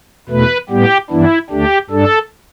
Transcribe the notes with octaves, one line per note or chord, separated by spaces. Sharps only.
E2 B2 A3 B4
A2 G3 B3 G4
G2 E3 B3 D4 E4
D2 D3 A3 D4 G4
G2 G3 D4 A4